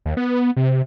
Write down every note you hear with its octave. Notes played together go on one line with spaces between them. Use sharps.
D#2
B3
C3